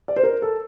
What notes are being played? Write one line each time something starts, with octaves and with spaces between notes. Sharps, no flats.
D5
C5
A#4
A4